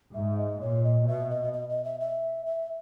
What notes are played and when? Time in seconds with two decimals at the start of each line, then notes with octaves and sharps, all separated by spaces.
0.14 G#2 E5
0.38 D#5
0.61 A#2 C#5
0.84 D#5
1.07 B2 E5
1.30 D#5
1.53 D#5
1.69 D#5
1.85 E5
2.00 E5
2.46 E5